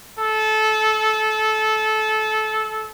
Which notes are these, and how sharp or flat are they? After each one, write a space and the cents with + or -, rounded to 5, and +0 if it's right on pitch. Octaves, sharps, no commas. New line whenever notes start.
A4 -20